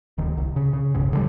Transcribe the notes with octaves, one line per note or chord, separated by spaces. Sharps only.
D1 D#3
C2
C#3
C#3
E1 B1 G2 C#3
D3 D#3 G3